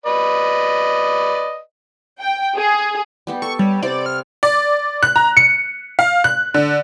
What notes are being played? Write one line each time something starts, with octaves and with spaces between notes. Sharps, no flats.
B4 D5 D#5
G5
G#4
G3 B3 G4
A4 C#6
G3 C#5
C3 G3 C4 D5
F6
D5
F#6
A#5
C#7
F5
F#6
D3